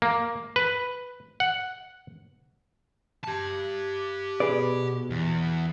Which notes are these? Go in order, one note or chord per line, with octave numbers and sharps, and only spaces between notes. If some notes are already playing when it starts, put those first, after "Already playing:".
A#3
B4
F#5
G4 A5
B2 G#4 B4 D5
E2